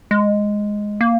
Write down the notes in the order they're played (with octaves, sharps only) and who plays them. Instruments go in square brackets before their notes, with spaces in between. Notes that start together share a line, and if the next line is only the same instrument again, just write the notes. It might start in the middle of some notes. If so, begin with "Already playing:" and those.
[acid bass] G#3
A#3